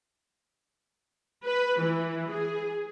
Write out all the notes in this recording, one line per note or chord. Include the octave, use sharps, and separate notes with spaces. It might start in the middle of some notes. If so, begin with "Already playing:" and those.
B4
E3
G#4